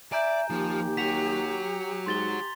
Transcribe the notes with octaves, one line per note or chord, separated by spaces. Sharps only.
D5 E5 G#5 A#5 G6
D#2 F3 G4
F#4 C#5 B6 F7
G#2 C6 A6 G7